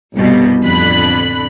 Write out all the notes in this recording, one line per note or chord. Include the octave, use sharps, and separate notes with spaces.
G1 C2 B2 G3
A1 F2 D3 B5 F#6